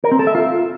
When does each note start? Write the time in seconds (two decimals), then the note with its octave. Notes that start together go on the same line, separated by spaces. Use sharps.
0.04 A#4
0.11 C4
0.19 A4
0.27 E5
0.35 F4